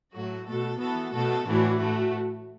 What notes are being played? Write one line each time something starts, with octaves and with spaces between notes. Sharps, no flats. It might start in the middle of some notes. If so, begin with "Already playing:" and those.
A2 F#3 A3 F#4
B2 A3 F#4 A4
E3 B3 F#4 A4
B2 A3 F#4 A4
A2 E3 D4 F#4
A2 A3 F#4